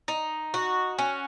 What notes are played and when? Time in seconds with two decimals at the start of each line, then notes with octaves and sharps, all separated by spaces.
0.08 D#4
0.54 F#4
0.98 C#4